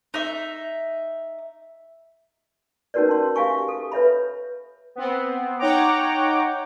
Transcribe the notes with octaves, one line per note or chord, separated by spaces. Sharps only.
D#4 E5
C#4 D#4 F#4 A#4 B4 D5
A5 C6
G4 E5 F5 G#5 C#6
A4
B4 C#5 E5 B5
B3 C4
D#4 C#5 F#5 G5 A#5 D6